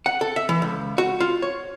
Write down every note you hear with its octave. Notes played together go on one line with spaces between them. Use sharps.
F#5
A4
E5
E3
C#2
F#4
F4
C#5